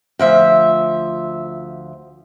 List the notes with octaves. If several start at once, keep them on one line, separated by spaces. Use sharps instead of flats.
D2 F3 E5